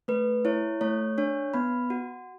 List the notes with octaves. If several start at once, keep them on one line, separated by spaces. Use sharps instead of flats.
A3 B4
E4 C#5
A3 C#5
D4 C#5
B3 B5
F#4